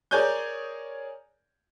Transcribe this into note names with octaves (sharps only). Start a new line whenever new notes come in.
G#4 A#4 C#5 D5 G#5 G6